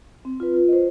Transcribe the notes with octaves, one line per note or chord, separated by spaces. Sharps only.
C4
F4 B4
F4
C5 D#5